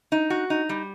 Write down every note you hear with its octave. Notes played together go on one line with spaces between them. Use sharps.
D#4
F#4
D#4
G3